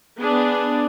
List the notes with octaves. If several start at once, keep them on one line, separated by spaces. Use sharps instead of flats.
B3 D4 G#4